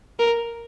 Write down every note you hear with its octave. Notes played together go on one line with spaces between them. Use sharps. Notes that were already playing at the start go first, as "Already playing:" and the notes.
A#4